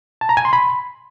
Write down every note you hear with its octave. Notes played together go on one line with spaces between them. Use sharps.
A5
A#5
G#5
C6
B5